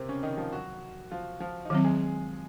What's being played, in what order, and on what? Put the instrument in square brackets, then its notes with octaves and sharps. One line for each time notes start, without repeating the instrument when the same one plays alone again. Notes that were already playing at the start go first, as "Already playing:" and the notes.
Already playing: [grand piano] C3 A#3 C4
C#3 C#4
D#3 D#4
F3 F4
F#3 F#4
F3 F4
F3 F4
D#4
[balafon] D#3 F#3 C4 [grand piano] F3 F4
[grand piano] G#3 G#4